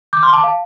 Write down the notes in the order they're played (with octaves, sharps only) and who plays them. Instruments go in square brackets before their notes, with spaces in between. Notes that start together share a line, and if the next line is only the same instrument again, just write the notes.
[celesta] D6 G6
C6 F6
A5 D6
F5 A5